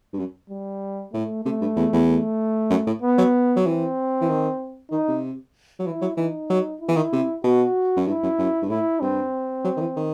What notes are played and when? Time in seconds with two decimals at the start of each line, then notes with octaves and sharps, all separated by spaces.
0.13 G2
0.19 F#2
0.50 G3
1.13 A2 A3
1.44 C3 A3
1.61 G2
1.76 E2
1.93 E2
2.08 A3
2.70 F#2
2.87 A2
3.02 B3
3.18 F#3
3.56 F#3
3.65 E3 C4
4.21 E3
4.29 D#3
4.91 D#3 D#4
5.08 C3
5.79 F#3
5.85 E3 E4
6.01 F#3
6.17 E3 D#4
6.50 F#3
6.81 E4
6.88 E3
6.96 D#3
7.13 C3
7.44 B2 F#4
7.96 F#2
8.07 G2 E4
8.23 F#2
8.39 F#2
8.62 G2
8.70 A2 E4
9.01 G2 C4
9.64 F#3
9.77 D#3
9.80 E3
9.96 D#3